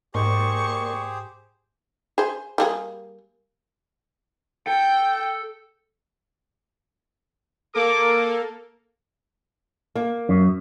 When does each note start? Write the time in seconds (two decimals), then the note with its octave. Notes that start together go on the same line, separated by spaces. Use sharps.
0.15 G#2 A#3 G4 G#4 A#4 C5 D5 C#6
2.18 G#4 C5
2.58 G3 A#3 G#4
4.67 A4 G5
7.74 A#3 A4 A#4 D6
9.95 A#3
10.29 F#2